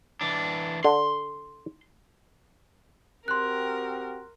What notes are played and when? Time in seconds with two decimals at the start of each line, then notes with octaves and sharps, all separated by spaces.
0.21 E3 D4
0.84 D3 C6
3.28 C4 F#4 G4 A#4 C6 F#6